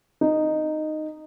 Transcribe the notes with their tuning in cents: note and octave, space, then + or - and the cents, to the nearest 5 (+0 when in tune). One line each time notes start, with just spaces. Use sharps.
D#4 -10